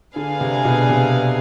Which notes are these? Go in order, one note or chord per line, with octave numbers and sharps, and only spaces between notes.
D3 D4 G#4 B4 F5 G#5
C3
B2
C3